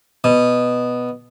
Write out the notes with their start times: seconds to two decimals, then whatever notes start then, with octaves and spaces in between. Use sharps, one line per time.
0.24 B2